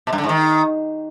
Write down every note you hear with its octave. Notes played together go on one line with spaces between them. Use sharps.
B2
G2
D3
G#2
D#3